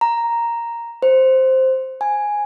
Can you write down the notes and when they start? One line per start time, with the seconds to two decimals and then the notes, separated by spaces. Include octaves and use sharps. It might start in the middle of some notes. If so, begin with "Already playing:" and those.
0.01 A#5
1.02 C5
2.01 G#5